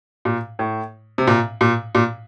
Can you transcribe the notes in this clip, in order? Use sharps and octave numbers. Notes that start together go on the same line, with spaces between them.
A#2
A2
C3
A#2
A#2
A#2